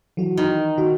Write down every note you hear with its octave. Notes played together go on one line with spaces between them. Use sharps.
E3 F#3 F#4
D#3
D#3 F#4